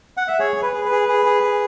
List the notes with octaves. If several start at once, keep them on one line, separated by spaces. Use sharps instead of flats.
F#5
E5
G#4 C#5
G#4
B4
G#4
B4
G#4
G#4
G#4
G#4